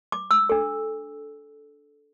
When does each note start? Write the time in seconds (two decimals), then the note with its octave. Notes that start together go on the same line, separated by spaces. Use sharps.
0.12 D6
0.31 E6
0.49 D4 A4